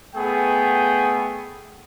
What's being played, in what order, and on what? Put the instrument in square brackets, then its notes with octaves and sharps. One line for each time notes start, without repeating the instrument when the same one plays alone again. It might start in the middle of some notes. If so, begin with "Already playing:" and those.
[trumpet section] A3 B3 G#4 G5